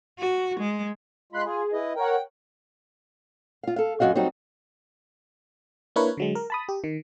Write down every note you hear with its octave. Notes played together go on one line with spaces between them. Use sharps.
F#4
G#3
G#3 F4 B5 C6 F#6
F4 G#4
E4 B4 D#5
A#4 C#5 F#5 G5
F4 F5
A4 F5
F#2 D#3 F#4 D#5 F5
F#3 G3 C4 D#4 F#4
A#3 D4 E4 A#4 B4 C#5
D3 F#3 G#3
A#4
A5 B5 D#6
G4
D#3